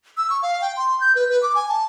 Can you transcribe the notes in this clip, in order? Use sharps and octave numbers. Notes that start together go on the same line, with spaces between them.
E6
C#6
F5
G5
C6
G6
B4
B4
D6
G#5
A5